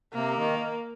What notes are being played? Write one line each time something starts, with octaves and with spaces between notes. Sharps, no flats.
C3 A#3
D#3